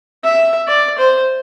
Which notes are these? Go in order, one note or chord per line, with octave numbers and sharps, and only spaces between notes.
E5
D5
C5